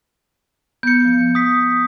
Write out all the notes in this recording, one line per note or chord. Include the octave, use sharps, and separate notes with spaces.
B3 G6 C#7
F3
D#6 B6